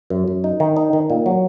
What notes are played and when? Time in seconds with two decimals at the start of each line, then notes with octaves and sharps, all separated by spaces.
0.10 F#2
0.28 F#2
0.44 D#4
0.60 D#3
0.76 D#4
0.93 D#3
1.10 A#2
1.26 F#3